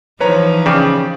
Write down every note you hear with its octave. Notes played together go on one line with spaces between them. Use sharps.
E3 F3 D#4 B4 C#5 A#5
C#3 D5 G5 D6